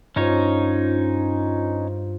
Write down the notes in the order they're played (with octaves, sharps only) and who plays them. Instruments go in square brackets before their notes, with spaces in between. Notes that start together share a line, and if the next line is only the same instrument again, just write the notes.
[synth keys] G2 F4 C5 [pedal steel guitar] C#4 D#4 C#5